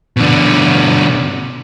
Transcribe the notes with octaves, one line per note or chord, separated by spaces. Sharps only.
B2 D3